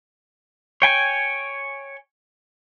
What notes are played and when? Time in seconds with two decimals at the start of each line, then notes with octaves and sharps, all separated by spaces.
0.82 C#5 G5 G#5